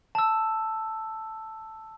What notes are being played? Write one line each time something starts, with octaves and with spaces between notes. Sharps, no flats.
A5 E6